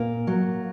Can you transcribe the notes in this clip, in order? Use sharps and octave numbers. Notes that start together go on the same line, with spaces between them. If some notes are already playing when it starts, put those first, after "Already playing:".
Already playing: A#2 A#3
F#3